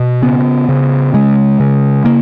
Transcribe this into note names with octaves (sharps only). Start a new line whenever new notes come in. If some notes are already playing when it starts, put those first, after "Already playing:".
Already playing: B2
C#3 B3
C#3
C#3 G#3
C#3
C#3 A#3